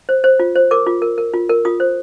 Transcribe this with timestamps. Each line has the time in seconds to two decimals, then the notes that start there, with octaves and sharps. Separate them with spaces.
0.09 C5
0.24 C5
0.39 F4
0.56 C5
0.71 A#4 D6
0.86 F4
1.02 A#4
1.18 A#4
1.34 F4
1.49 A#4
1.65 F4 D#6
1.80 C5